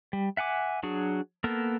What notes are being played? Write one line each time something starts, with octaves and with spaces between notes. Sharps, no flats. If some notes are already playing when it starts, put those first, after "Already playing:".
G3
E5 F#5 G#5 D6
F#3 D4 F#4 G#4
A#3 B3 A4 A#4